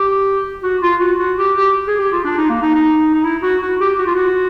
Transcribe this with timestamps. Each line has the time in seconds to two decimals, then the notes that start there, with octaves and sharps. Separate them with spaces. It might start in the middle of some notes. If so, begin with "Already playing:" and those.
Already playing: G4
0.63 F#4
0.82 F4
1.01 F#4
1.19 F#4
1.38 G4
1.57 G4
1.88 G#4
2.00 G4
2.12 F4
2.25 D4
2.38 D#4
2.49 A#3
2.62 D#4
2.75 D#4
3.14 D#4
3.24 E4
3.43 F#4
3.62 F#4
3.80 G4
3.99 F#4
4.06 F4
4.15 F#4